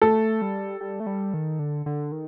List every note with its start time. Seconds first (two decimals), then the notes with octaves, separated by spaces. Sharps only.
0.02 A3 A4
0.42 G3
0.81 G3
1.00 A3
1.06 G3
1.34 D#3
1.59 D3
1.86 D3
2.12 D#3